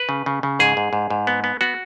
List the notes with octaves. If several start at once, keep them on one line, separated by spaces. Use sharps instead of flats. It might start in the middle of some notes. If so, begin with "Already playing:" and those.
Already playing: B4
C#3
C#3
C#3
G#2 G#4
G#2
G#2
G#2
B3
B3
B3 F#4